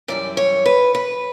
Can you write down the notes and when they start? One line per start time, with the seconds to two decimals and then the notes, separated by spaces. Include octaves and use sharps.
0.08 F#2 E3 G3 D5
0.37 C#5
0.66 B4
0.95 B4